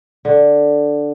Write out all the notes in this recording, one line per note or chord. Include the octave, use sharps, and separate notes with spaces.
D3